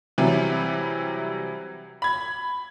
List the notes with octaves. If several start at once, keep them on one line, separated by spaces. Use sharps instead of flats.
C3 E3 F#3 G3
B5 G#6